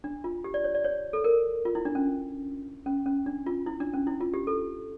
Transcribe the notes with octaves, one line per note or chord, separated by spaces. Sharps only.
D4
F4
G4
D5
C#5
D5
C#5
A4
A#4
F4
E4
D4
C#4
C#4
C#4
D4
F4
E4
D4
C#4
E4
F4
G4
A4